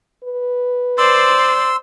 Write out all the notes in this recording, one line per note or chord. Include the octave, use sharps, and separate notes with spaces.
B4
C5 D5 C6 E6